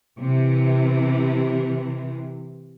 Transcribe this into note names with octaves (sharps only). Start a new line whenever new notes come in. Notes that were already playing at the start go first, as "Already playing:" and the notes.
C3 E3